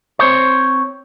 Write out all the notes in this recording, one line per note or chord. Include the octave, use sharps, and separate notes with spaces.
C4 C5 C#5